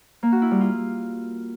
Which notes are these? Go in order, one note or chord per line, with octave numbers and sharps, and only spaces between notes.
A#3
F#4
E4
G3
F4